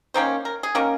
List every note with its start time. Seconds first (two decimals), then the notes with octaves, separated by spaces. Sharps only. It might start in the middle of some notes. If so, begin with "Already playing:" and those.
0.14 D#3 A#3 C#4 C5
0.45 A#4
0.63 G#4
0.75 D#3 A#3 C#4 A#4